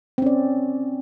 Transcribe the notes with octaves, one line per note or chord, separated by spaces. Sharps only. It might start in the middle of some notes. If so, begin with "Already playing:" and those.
C4 C#4 D5